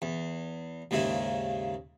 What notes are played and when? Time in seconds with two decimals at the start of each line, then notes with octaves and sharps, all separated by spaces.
0.02 E2
0.91 D#2 G#2 C#3 E4